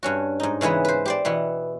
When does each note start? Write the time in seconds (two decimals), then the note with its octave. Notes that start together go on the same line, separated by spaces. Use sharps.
0.03 G2 C#4 F#4
0.40 G#2 D#4
0.61 C#3 E3 G#3 B3 B4
0.85 B4 C5
1.06 G4 C5 D5
1.25 B2 E3 B3